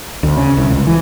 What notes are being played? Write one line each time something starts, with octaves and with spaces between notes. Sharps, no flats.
D2
C#3
C2
C#2
E3